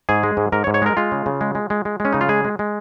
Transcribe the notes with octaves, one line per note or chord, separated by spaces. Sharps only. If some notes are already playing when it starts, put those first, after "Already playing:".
G#2 G#4
G#3
G#2
G#2 A#4
C#5
G#2
C#5
G#3 A#4
G#3 F4
C#3
C#3
G#3
G#3
G#3
G#3
G#3 C#4
C#3 D#4
F4
G#3 G#4
G#3
G#3